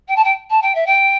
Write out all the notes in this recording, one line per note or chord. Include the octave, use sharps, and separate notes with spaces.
G5
A5
G5
A5
G5
E5
G5